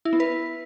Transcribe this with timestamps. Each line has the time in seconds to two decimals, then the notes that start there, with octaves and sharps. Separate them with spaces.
0.05 E4
0.13 B3
0.20 B4